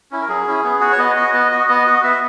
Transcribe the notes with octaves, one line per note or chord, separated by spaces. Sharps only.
C#4 E4
A#4
F#3 G#4
C#4 E4
B3
F#4
C#5
B3 D#5
F#4
B3
F#4
B3 D#5
F#4
B3 E5